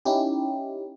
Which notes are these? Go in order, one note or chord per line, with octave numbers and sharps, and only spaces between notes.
C#4 D#4 E4 G4